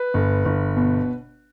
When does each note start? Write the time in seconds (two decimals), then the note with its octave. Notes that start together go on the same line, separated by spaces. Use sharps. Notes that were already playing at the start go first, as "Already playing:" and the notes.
Already playing: B4
0.14 G1
0.45 G1
0.77 B2